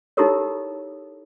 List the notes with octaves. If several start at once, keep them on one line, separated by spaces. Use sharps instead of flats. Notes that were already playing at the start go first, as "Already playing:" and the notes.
D#4 E4 G4 A4 A#4 C#5